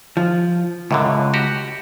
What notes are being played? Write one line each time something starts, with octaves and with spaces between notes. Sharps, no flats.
F3
C#2 F#2 A2 D3
F#4 G4